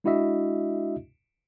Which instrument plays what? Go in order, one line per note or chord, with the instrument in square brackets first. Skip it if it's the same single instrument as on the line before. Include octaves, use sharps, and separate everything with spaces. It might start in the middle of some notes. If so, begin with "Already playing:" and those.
[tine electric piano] G#3 D4 E4 F#4 D#5 E5